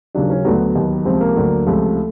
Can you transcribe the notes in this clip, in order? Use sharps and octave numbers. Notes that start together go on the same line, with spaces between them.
D#2 C#3 F#3 D4
C#4
D2 D3 F#3 B3
D#2 D#3 F#3
C#2 C3 F3 C4
A#3
D2 D3 F#3
C#2 C3 F3 A3